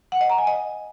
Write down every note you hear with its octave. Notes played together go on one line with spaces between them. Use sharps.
F#5
D#5
A#5
G#5
D#5